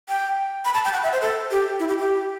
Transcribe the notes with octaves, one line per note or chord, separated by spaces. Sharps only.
G5
B5
A5
G5
F#5
E5
C5
A4
G4
E4
G4
G4